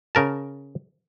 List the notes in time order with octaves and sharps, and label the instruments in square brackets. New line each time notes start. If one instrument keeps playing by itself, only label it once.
[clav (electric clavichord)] C#3 A#4 A5